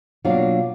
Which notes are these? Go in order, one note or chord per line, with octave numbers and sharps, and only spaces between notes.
B2 F#3 A#3 D4 F4 F5